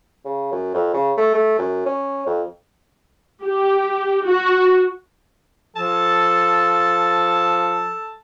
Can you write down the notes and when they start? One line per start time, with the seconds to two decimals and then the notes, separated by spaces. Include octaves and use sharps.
0.25 C#3
0.52 F#2
0.74 F2
0.94 C#3
1.17 A3
1.35 A3
1.59 F#2
1.86 C#4
2.27 F2
3.43 G4
4.25 F#4
5.76 F3 A4 A5